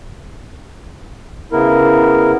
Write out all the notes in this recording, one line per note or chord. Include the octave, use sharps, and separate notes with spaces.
C#3 B3 E4 A#4